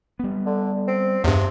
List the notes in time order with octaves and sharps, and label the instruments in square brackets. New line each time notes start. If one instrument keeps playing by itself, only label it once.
[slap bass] G3 B3
[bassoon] D3
C4
[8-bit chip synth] E2 G2 [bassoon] C3